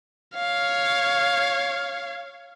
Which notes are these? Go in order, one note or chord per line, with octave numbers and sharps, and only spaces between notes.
C#5 F5